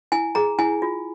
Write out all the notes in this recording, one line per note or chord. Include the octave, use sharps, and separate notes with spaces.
E4 G#5
G#4 A#5
E4 G#5
F4